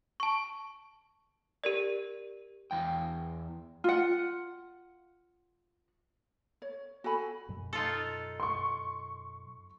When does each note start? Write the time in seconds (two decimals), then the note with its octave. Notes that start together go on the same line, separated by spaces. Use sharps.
0.20 A5 C#6
1.64 G4 A#4 D5
2.71 E2 G5
3.84 F4 F#5
6.62 C#5
7.04 F#4 A4 G#5 B5
7.49 F#2 B2 F#3
7.73 D#4 F4 A4
8.40 C6 C#6